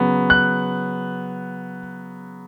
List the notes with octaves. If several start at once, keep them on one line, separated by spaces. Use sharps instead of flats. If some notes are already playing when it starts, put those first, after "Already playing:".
Already playing: C#3 F#3 B3
F#6